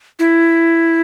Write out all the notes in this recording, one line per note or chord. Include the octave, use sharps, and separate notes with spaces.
E4